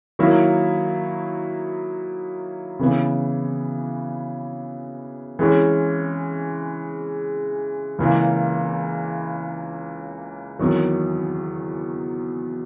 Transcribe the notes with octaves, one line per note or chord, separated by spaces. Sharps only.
D#3 F#3 A#3 E4
C#3 E3 B3
E3 G#3 C#4
C#2 C#3 E3 A#3
E2 D#3 F#3